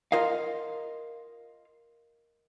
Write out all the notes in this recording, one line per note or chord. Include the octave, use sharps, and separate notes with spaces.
F4 A#4 D#5 F5